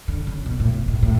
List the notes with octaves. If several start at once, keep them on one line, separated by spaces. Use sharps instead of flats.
D3
C#3
B2
A2
B2
A2
A2